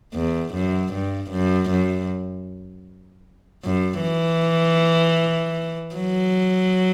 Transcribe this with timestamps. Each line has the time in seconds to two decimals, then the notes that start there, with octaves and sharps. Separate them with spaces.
0.15 E2
0.54 F#2
0.93 G2
1.31 F#2
1.70 F#2
3.64 F#2
4.02 E3
5.95 F#3